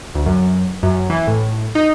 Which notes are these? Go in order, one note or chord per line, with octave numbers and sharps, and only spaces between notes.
D2
F#2
F#2
E3
A2
D#4